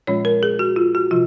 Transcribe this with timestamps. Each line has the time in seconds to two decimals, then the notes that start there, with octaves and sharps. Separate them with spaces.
0.07 A#2 F3 G#3 C#4 F4 C#5
0.25 A#4
0.43 G#4
0.59 F#4
0.76 F4
0.95 F#4
1.11 C3 F3 F4